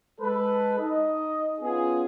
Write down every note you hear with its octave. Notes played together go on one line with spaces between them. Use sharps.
G#3 A4 B4
D#4 D#5
B3 C#4 F4 G#4